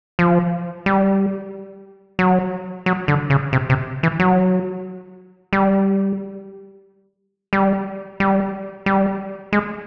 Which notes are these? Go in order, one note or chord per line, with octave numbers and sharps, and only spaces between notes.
F3
G3
F#3
F#3
D3
C#3
C3
C3
E3
F#3
G3
G3
G3
G3
G#3